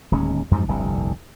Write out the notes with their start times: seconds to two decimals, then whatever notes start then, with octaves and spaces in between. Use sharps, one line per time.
0.12 D1 D#2 G#3 C#4
0.51 F2 G#2 F3 G3
0.68 F1 C2 G2 D3